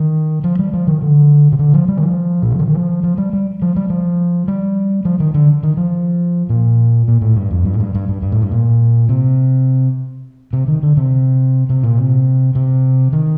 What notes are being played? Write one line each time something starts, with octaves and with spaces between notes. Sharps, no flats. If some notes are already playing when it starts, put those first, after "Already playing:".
Already playing: D#3
F3
G3
F3
D#3
D3
C3
D3
F3
G3
D#3
F3
A#2
C3
D3
D#3
F3
F3
G3
G3
F3
G3
F3
G3
F3
D#3
D3
D#3
F3
A#2
A#2
A2
G2
F2
G2
A2
G2
G2
G2
G2
A2
G2
A#2
C3
C3
D#3
D3
C3
C3
A#2
C3
C3
D#3